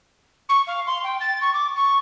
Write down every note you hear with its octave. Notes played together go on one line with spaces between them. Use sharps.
C#6
F5
C6
G5
A6
C#6
D6
C#6